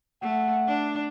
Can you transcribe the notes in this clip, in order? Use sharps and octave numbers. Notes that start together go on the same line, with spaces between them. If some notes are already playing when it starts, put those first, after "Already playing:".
A3 F#5
D4